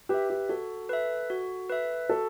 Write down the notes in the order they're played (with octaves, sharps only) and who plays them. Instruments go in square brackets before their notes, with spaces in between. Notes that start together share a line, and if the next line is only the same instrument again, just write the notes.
[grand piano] G4 [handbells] B4 E5
[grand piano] G4
[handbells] F#4 [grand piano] A4
[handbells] B4 E5
F#4
B4 E5
[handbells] F#4 [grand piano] A4